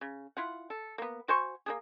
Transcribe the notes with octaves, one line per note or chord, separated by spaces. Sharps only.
C#3
E4 F4 F#5
A4
A#3 B3
F#4 C5 G#5 C#6
A#3 D4 G#4